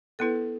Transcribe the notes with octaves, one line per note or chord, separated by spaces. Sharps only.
B3 E4 A4 B4